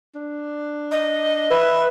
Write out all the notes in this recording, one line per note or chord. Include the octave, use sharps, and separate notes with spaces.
D4
D#5
B4 E5